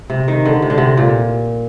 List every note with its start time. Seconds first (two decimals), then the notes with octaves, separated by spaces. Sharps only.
0.10 C3
0.28 D#3
0.46 D3
0.62 C3
0.70 D3
0.78 C3
0.98 A#2